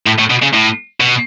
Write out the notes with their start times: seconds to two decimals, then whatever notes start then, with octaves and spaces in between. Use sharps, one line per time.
0.07 A2
0.19 A2
0.30 B2
0.43 C#3
0.54 A2
1.00 B2